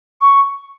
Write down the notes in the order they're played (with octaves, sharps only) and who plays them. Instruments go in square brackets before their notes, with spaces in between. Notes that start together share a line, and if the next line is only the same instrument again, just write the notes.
[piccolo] C#6